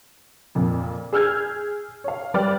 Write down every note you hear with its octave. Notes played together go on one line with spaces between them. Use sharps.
F2 A#2
G#4 E6 F6 G6 G#6
C#5 F5
G3 B4 D5 G5 F6